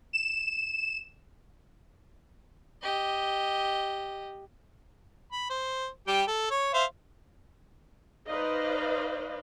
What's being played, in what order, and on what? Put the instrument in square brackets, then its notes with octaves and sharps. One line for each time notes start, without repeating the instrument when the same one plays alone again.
[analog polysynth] E7
[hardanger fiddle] G4 D#5
[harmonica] B5
C5
G3 G4 G5
A4
C#5
C5 E5 F5
[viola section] D#4 B4 C5 D5 D#5 F5